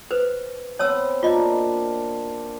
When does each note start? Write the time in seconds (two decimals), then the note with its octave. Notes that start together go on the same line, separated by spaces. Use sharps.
0.11 B4 C5
0.79 B3 C4 C#5 A5 E6
1.23 A#3 D4 F4 D#5